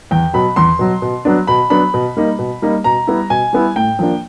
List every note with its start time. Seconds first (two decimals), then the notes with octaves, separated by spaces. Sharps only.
0.11 E2 G5
0.33 B2 F#3 B5
0.56 E2 C6
0.79 B2 F#3
1.02 B2
1.25 F#3 B3 D4
1.47 B2 B5
1.70 F#3 B3 D4 B5
1.94 B2
2.16 G3 A#3 D#4
2.39 B2
2.62 G3 A#3 D#4
2.84 B2 A#5
3.07 G3 B3 E4
3.30 B2 G#5
3.53 G3 B3 E4
3.76 A2 G5
3.99 F3 A#3 D4